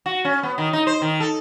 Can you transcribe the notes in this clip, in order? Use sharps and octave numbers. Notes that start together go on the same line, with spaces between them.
F#4
C#4
B3
D#3
D#4
C5
D#3
A4